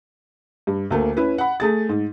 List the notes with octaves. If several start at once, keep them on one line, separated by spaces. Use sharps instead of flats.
G2
D2 A3 A#3
C#4 E4 B4
F#5 B5
A3 G#4 A6
G#2